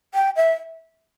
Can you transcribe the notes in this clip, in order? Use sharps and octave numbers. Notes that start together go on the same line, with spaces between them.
G5
E5